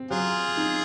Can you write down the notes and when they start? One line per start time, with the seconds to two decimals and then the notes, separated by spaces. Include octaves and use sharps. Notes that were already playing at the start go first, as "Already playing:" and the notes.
Already playing: C4
0.11 F#3 F4 G#4
0.57 D#4